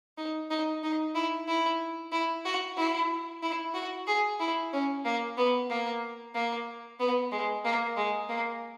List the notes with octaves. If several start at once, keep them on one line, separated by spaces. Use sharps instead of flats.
D#4
D#4
D#4
E4
E4
E4
F#4
E4
E4
F#4
G#4
E4
C#4
A#3
B3
A#3
A#3
B3
G#3
A#3
G#3
A#3